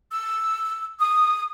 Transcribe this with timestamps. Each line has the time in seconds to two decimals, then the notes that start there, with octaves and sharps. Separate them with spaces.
0.12 E6
1.00 D#6